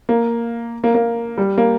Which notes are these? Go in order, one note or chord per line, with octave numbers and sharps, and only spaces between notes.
A#3
A#3
A#3
G3
A#3